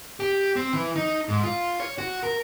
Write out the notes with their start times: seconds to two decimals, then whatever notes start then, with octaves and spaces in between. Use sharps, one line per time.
0.20 G4
0.56 C4
0.73 E3
0.96 D#4
1.28 G#2
1.44 F4
1.80 C#5
1.98 F#4
2.23 A#4